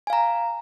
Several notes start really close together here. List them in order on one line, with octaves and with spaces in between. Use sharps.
G#5 F5 A#5